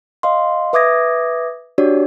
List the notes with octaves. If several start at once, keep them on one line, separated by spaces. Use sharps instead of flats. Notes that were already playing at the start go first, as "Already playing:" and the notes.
D#5 F5 C6
B4 E5 D6 D#6 G#6 A#6
D4 F#4 G4 C#5 D5